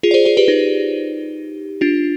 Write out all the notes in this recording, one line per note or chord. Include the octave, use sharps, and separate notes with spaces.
F4 G#4
D5
G#4 C5
G#4 C5
G4 B4
D#4 G4
D4 F4